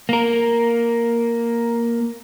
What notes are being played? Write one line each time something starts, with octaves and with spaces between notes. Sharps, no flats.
A#3 A#4